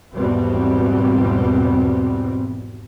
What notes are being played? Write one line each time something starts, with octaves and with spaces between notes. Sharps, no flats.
G#1 E2 B2 G3 B3 C4